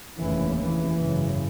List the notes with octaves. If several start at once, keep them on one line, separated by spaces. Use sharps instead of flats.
F1 D#2 C#3 E3
E3
G#1 F#2 C#3